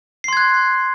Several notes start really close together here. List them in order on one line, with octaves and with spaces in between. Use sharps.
C7 C6 G#6 F#6